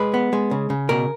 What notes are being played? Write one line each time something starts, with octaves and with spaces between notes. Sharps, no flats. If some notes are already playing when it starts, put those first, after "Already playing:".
Already playing: G#3 B4
B3
G#3
C#3
C#3
B2 A#4